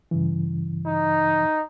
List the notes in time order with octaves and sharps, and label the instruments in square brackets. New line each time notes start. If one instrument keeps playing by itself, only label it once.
[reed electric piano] G2 C#3 E3
[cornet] D#4